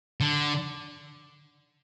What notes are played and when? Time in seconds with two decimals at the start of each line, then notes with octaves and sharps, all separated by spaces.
0.21 D3